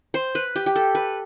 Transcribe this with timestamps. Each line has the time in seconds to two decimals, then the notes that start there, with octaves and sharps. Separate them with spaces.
0.14 C5
0.35 B4
0.56 G4
0.66 G4
0.76 A4
0.95 B4